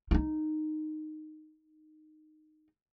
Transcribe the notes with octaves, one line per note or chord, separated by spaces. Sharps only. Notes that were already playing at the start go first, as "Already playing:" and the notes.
D#4 F4